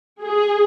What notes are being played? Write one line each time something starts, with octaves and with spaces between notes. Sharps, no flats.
G#4